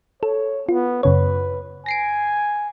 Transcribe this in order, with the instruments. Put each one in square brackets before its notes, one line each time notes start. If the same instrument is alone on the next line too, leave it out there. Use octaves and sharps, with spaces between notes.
[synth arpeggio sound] A4 [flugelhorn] C#5
[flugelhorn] B3 [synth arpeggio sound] F4
[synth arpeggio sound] F#2 C#3 C#5 [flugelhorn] B4
[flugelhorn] G#5 [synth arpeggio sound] A#6 C7 D7